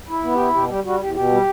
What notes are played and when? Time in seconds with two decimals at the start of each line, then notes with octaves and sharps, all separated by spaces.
0.08 E4
0.24 B3
0.34 G4
0.39 E4
0.54 B2 G4
0.69 G3 G4
0.84 G3 F#4
1.00 E2 G4
1.15 B2 G4
1.31 G3